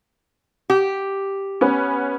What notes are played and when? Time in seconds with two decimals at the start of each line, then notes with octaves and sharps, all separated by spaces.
0.70 G4
1.61 B3 C#4